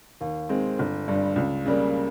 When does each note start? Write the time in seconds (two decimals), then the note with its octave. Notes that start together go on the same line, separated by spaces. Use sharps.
0.21 D#2
0.49 D#3 G#3 C4
0.79 G1
1.08 G2 G3
1.36 C#2
1.66 C#3 G3 A#3